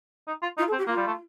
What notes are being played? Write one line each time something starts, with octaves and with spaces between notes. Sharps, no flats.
D#4
F4
D#4 F4
A4
C4
G4
A#3 F4
G3
A3